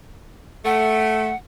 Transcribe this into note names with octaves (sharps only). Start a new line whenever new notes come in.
A3 F#5